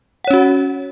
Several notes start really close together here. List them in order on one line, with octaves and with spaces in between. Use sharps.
F#5 C#5 C#4 F#4